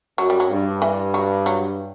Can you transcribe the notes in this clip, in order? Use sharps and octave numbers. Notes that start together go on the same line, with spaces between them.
F#2 F#3
G3
F#3
G2
E3
F#3
F#3